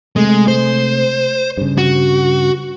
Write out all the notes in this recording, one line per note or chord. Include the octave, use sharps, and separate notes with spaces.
C3 G#3 A3
C5
G2 C#3
F#4